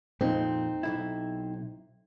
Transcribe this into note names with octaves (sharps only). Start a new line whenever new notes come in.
F2 A#2 C4 D#4
B1 E2 E4